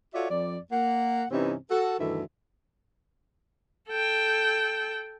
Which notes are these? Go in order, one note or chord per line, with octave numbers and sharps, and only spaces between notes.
F4 F#4 A4 C#5 D5 E5
F2 D5
A#3 F#5
G2 C3 E3 C4 C#4 D#4
F#4 A4
D2 G2 D#3 E3 A4 E5
A4 G5